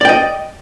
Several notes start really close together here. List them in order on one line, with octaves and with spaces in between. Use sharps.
D5 G5 D#5